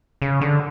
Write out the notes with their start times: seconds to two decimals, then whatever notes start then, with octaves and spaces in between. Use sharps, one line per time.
0.22 C#3
0.41 D3